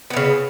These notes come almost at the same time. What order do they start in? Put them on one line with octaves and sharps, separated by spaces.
B3 E3 C#3